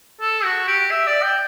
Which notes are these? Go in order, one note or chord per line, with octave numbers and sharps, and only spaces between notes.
A4
F#4
G4
E5
D5
G5